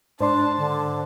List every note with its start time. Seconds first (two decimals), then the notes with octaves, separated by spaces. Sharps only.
0.20 G#2 D4 C5 D5 A5 C6
0.58 D3